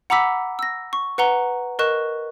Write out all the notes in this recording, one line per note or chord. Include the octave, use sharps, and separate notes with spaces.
F#5 A#5 B5 D6 E6 B6
E6 A#6
C#6
B4 F#5 A#5 G7
A#4 D#5 C#6 F#6 E7